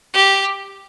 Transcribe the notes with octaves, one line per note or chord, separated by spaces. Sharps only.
G4